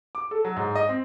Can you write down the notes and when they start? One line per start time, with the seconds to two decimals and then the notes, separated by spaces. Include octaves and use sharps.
0.15 D6
0.31 A4
0.45 F#3
0.56 G#2
0.75 D#5
0.89 C4